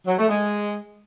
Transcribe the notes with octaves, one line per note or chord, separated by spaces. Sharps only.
F#3
A3
G#3